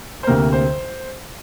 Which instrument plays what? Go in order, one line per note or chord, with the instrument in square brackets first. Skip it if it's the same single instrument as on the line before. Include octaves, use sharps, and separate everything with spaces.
[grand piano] C5
D2 C3 A#3 A#4
C5